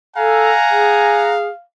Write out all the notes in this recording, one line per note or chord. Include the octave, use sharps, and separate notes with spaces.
A4 F5 F#5 G#5 A#5
G#4